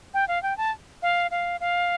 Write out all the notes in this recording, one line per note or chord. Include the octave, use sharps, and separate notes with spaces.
G5
F5
G5
A5
F5
F5
F5